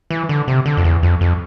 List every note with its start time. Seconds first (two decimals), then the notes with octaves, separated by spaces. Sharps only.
0.10 E3
0.29 D3
0.48 C3
0.66 D3
0.77 F2
0.84 E2
1.03 F2
1.21 F2